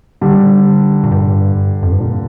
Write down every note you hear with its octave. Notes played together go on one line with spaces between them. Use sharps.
D3 G3
A#2
G2
F2
G2
A#2